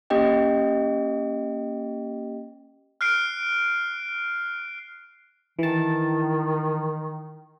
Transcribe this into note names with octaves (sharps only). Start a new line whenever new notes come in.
A#3 C#4 G4 D#5 G5
F6 F#6 C7 D7
D#3 E3 A5